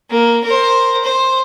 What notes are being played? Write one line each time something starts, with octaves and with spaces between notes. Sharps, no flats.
A#3
A#4 C5
C5